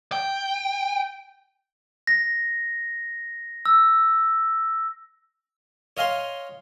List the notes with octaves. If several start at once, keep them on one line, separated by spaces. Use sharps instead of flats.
G5
A#6
E6
C#5 D#5 F5 G#5 C6